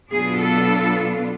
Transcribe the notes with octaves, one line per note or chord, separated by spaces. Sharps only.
B2 F#3 B3 D4 F4 G#4
A4